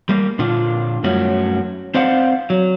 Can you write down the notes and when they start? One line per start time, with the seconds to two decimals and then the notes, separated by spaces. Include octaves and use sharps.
0.09 G3 A#3
0.39 A#2 D3 D4 F4
1.03 F#2 G3 A3 C#4 F#4
1.94 C4 C5 D5 F5 F#5
2.50 F#3